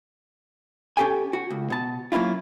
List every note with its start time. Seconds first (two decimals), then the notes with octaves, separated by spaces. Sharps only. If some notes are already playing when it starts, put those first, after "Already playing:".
0.97 C#4 F4 G4 A4 G5 G#5
1.33 F#4
1.50 C#2
1.70 B2 A5
2.12 F#3 A#3 C#4 E4 F4